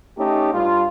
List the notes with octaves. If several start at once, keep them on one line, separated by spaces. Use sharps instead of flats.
A3 C#4 D#4 G4
G2 F4